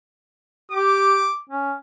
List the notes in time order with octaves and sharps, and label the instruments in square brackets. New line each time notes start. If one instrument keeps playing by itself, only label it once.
[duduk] G4 [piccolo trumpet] D6
[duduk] C#4